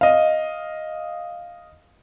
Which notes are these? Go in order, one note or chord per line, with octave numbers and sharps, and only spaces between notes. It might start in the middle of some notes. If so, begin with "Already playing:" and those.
D#5 F5